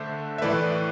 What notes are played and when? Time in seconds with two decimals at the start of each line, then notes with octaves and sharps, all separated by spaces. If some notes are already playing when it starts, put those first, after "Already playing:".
Already playing: D3 A3 D4 C5 E5
0.38 E5
0.42 A2 E3 A3 B4 D5